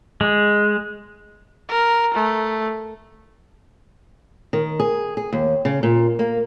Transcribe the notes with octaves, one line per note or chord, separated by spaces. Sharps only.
G#3
A#4
A3
D#3
G#4
G#4
D#2
C#3
A#2
A#3